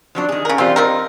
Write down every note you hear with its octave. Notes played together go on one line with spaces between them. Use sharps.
F3 F#3 D4
D#3 G#4
C#3 A#4
E3 G3 C4 F4
F3 C4 D#4 A#4